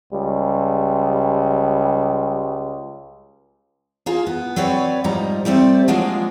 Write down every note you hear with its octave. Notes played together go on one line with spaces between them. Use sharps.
C#2 G3
A#3 F4 G#4
B3
F#3 C4 B4 C#5 D5
G#2 F3 G3 D#4 A#5
G3 A3 C4 C5 D5
F3 F#3 G#3 A#3 D4 F4